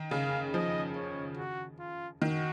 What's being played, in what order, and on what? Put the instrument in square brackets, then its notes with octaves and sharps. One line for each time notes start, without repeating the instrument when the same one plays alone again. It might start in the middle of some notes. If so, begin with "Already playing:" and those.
Already playing: [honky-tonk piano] D#3
[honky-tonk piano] C#3 [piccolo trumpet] F5
[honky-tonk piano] F3 [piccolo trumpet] D#5
[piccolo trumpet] C#5
F#4
F4
[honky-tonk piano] D#3 [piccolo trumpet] F#4